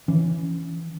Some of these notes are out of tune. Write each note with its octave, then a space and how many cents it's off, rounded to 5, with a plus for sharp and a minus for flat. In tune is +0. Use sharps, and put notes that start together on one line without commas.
E3 +10 C#4 +5